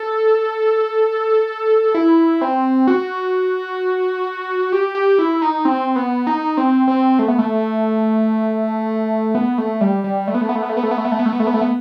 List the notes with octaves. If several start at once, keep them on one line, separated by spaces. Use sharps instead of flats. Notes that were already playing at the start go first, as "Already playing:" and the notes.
Already playing: A4
E4
C4
F#4
G4
G4
E4
D#4
C4
B3
D#4
C4
C4
A3
B3
A3
B3
A3
G3
G3
A3
B3
A3
B3
A3
B3
A3
B3
A3
B3
A3
B3
A3
B3
A3
B3
A3
B3
A3
B3